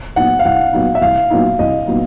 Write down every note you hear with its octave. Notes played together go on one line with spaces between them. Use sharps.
A#2 F#3 B3 D#4 F#5
F5
C2 F#5
A#2 F#3 B3 D#4
E5
C2 F5
A#2 F#3 B3 D#4
C2 D#5
A#2 F#3 B3 D#4